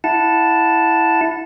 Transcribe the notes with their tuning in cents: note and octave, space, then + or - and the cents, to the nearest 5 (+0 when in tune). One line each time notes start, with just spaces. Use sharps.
E4 +0 F#5 -20 A5 +0